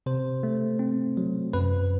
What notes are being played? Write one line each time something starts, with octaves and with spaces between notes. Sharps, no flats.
C3 C5
A3
C4
F#3
F#2 B4